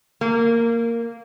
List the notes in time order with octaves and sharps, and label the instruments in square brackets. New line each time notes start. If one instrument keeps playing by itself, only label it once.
[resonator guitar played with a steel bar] A#3